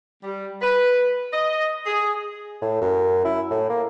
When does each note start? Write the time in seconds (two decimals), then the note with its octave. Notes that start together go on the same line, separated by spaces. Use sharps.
0.24 G3
0.62 B4
1.33 D#5
1.87 G#4
2.62 A2
2.81 F#2
3.25 E4
3.50 A2
3.70 A#3